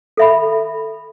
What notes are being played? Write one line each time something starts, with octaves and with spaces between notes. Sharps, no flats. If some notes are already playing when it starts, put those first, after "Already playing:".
A4 E5 B5